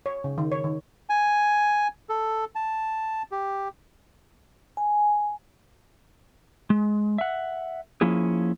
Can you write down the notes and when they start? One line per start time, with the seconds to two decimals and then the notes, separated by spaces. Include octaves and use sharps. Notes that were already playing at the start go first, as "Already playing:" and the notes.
0.06 C#5
0.24 C#3
0.38 D#3
0.52 C#5
0.64 D#3
1.09 G#5
2.09 A4
2.55 A5
3.32 G4
4.77 G#5
6.70 G#3
7.18 E5 F#5
8.01 F3 A#3 C#4 E4 G#4